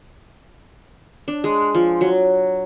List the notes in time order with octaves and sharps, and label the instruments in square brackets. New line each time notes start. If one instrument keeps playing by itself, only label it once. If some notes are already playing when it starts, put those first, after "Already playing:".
[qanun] D4
G#3
F3
F#3